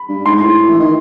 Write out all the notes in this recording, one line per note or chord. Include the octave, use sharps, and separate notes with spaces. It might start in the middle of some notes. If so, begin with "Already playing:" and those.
Already playing: B5
G2
G#2 C6
A2
E3
D#3